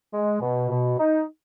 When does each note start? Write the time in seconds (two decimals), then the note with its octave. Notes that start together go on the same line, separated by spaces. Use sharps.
0.13 G#3
0.41 B2
0.69 B2
0.97 D#4